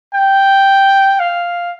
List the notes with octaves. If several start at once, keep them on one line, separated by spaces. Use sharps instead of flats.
G5
F5